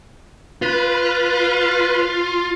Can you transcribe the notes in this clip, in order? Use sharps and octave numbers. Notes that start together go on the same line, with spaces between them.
F4 B4